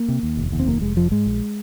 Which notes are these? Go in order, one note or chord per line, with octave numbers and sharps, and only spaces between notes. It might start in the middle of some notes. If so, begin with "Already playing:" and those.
Already playing: A#3
C3
D#2
F1
D#2
C4
F1 A#3
F1 G#3
F2 F3
G#2 G#3
A#1